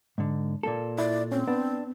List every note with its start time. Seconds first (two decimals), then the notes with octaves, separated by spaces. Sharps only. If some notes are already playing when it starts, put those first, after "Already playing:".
0.18 G#2 D3
0.63 A#2 A#3 A4
0.99 E4 D5
1.32 C4 C#4
1.48 B3 D4